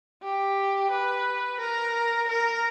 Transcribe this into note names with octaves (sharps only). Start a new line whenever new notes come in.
G4
B4
A#4
A#4